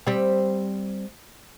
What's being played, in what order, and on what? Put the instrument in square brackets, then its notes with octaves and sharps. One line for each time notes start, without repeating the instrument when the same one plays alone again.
[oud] G3 C4